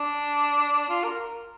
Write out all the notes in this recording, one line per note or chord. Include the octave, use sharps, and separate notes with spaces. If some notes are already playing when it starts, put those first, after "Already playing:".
Already playing: D4
F4
A#4